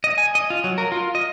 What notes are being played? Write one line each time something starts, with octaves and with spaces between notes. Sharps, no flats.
D#5
G#5
D#5
F4
F#3
A#4
F4
D#5